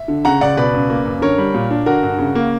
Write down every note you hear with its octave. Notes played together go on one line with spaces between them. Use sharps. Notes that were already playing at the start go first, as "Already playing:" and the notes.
Already playing: E5
D3
C#3 F#5 A#5
C#2 D5 F#5
B2 B4 D5
C#2
A#3
F#2
D3 A#4 C#5
G3
A#2
D4
D3 F#4 A#4
G2
C#3
A#3